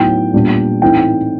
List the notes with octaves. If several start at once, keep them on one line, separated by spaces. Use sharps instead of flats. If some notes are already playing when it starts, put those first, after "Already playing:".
Already playing: A2 F#3 B3 D#4 G5
A#2 G3 B3 D4
A2 E3 A3 C4 D#4 G5